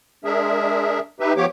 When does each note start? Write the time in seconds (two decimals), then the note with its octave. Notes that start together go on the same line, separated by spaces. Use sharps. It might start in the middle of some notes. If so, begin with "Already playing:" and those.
0.25 G#3 D4 G#4 A#4 E5
1.20 D#4 G4 B4 E5
1.37 F3 A#3 B3 G4 C#5 D6